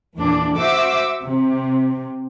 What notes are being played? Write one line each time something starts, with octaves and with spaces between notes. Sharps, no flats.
E2 A#2 D4
F#4 C5 E5 D6 E6
C3